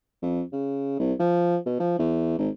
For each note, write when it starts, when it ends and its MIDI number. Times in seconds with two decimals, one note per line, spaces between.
0.22 0.42 41
0.52 0.98 49
0.99 1.13 36
1.19 1.56 53
1.66 1.77 47
1.80 1.96 53
1.98 2.38 40
2.38 2.49 32